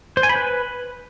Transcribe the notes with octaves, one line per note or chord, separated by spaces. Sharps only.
C5
G#5
B5
B4